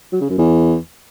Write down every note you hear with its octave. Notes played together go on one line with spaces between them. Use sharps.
F#3
C#3
F#2
E2